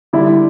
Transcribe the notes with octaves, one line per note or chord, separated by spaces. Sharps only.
D3 G3 D4 E4